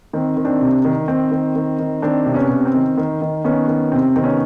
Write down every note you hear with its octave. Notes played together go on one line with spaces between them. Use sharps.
D#3 C4
D#3
C4 D4
C3
D#3
D#3 C4
D#3
D#3
D#3
D#3 C4 D4
C3
B3 C#4
C3
C4
D#3
D#3
D#3
D#3 B3 C#4
D#3
C3 C4
D#3 C4
B3 C#4